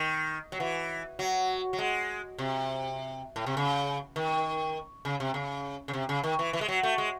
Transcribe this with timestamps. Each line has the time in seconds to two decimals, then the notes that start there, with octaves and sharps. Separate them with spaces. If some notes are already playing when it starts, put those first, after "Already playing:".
Already playing: D#3
0.52 F#3
0.60 E3
1.19 F#3
1.73 F#3
1.79 G#3
2.38 C3
3.36 A2
3.46 C3
3.57 C#3
4.16 D#3
5.05 C#3
5.20 C3
5.34 C#3
5.88 C#3
5.93 C3
6.09 C#3
6.24 D#3
6.39 E3
6.53 E3
6.61 G#3
6.68 F#3
6.83 A3
6.98 G#3